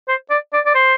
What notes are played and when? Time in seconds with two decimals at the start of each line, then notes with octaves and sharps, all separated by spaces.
0.08 C5
0.30 D5
0.53 D5
0.66 D5
0.75 C5